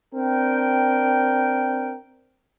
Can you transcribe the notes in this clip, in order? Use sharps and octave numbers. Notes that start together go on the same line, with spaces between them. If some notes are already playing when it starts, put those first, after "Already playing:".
C4 D4 A#4 G5